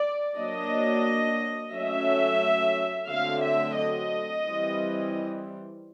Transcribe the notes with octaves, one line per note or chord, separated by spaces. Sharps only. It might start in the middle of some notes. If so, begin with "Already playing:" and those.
Already playing: D5
F#3 A#3 D4 D#5
F#3 A3 C#4 E5
D3 F#3 A3 C4 F5
E5
D#5
E3 G3 C4